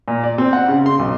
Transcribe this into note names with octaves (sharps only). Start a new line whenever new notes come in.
A#2
D5
C4
F#5
C#3
C6
B1